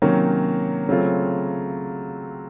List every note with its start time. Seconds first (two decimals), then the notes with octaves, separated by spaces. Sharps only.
0.02 C3 D#3 F#3 A#3 C#4
0.89 C#3 F#3 A3 C4 F4